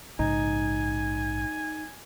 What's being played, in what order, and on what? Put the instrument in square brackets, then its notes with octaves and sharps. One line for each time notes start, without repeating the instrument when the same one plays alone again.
[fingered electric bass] A#1 G#2 C#3 [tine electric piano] D#4 [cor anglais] G#5